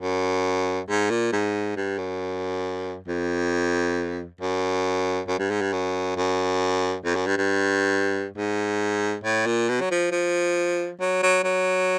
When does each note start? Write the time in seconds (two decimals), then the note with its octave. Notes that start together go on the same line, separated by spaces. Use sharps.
0.01 F#2
0.89 G#2
1.10 A#2
1.32 G#2
1.76 G2
1.98 F#2
3.08 F2
4.41 F#2
5.28 F#2
5.39 G2
5.51 G#2
5.61 G2
5.73 F#2
6.17 F#2
7.05 F2
7.16 F#2
7.27 G2
7.38 G2
8.37 G#2
9.24 A2
9.46 A#2
9.69 B2
9.81 F#3
9.91 F3
10.12 F3
11.01 F#3
11.23 F#3
11.44 F#3